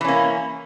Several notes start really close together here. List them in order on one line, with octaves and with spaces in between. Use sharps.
E3 C#4 A#3